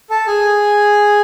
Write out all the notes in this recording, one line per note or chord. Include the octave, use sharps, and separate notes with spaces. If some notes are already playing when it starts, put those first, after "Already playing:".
A4 A5
G#4 G#5